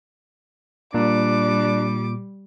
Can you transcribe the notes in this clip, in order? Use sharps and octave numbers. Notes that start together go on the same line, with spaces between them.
A#2 G3 D4 D6